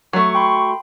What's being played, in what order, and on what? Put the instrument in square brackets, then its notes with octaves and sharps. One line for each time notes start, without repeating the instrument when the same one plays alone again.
[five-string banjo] F#3 A3 [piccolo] C#6
[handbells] G5 B5 C6